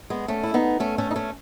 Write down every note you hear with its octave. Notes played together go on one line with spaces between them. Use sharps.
G#3 B3
A3 C#4
E4
B3 D#4
A3 C#4
A3 C#4
D#4
A3 C#4